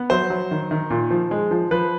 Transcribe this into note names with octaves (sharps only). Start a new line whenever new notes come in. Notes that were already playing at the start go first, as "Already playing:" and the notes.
Already playing: B3
F#3 C5
F#3
D#3
D#3
A#2
F3
G#3
F3
F3 B4